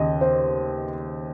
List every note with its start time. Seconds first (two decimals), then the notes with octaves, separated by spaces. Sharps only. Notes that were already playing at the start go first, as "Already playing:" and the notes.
Already playing: D#2 C#3 D#5
0.21 C5